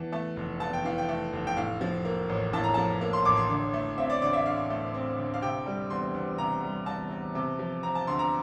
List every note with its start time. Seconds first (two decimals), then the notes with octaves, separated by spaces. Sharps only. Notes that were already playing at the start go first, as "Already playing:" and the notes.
Already playing: E2 E3 A5
0.12 A3 A5
0.36 F1
0.60 E2 A5
0.73 G5
0.85 E3 F5
0.98 G5
1.08 A3
1.33 F1
1.47 G5
1.57 A2 F5
1.81 F3
2.05 A#3
2.29 A1
2.53 A2 A5
2.64 A#5
2.74 F3 A5
3.01 A#3
3.13 C6
3.25 A1 D6
3.37 C6
3.50 D3
3.74 A3
3.98 C4 E5
4.10 D5
4.22 D2 D5
4.33 E5
4.46 D3 F5
4.70 A3
4.94 C4
5.18 D2
5.34 F5
5.42 C3 G5
5.66 G3
5.90 E2 C6
6.15 E2
6.38 C3 A#5
6.63 G3
6.86 E2 A5
7.11 E2
7.35 C3
7.59 F3
7.83 C4 A#5
7.95 A5
8.07 D2 C6
8.19 A#5